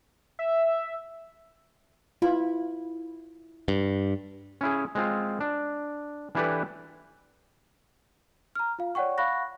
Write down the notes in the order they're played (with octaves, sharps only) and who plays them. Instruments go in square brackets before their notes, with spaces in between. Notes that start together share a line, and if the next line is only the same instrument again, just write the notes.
[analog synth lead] E5
[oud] E4 [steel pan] F4 B4
[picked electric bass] G2
[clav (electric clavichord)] C#4 E4 G#4
G#3 C4 F4
D4
E3 D4 E4 G4 A4 B4
[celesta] A#5 F6
F4 F5
C#5 D5 F#5 G5 C#6
F5 F#5 B5 C#6 F#6 A#6